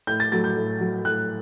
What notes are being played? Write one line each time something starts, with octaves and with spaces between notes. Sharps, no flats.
A2 G6
A6
F#3 A3 A6
G6
A2
F#3 A3
A2 F#6